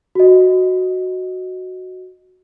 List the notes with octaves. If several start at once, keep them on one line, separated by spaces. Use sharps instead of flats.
F#4 D#5